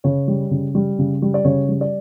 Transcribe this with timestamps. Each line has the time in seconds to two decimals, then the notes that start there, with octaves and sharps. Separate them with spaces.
0.04 C#3 C#5
0.28 G3
0.51 C#3
0.75 G3
0.99 C#3
1.22 G3
1.34 D5
1.45 C#3 C#5
1.69 G3
1.81 D5